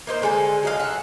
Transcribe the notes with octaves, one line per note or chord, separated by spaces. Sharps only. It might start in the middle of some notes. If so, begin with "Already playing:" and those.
A#3 D#4 C5
D3 G#3 A4 G#5
F#3 D#5 F5
E5 F#5